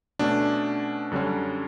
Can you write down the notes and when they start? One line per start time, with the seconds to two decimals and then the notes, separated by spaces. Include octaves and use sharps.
0.19 B2 A3 C#4 D4
1.11 F#2 D3 G3 C#4